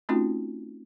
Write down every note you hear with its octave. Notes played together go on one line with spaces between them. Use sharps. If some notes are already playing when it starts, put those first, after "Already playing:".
A3 C4 C#4 D#4 F4 F#4